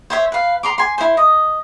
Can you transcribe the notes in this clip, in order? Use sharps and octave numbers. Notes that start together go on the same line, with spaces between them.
C5 C#5 E5
B4 F5
A#5 C6 D6
G#5 C6
E4 C5
D#5